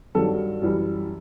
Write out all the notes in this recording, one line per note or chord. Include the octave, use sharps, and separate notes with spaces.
G2 D#3 F#3 A4
F#2 E3 G3